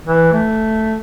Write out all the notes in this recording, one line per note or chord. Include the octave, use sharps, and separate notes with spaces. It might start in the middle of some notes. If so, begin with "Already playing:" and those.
E3
A3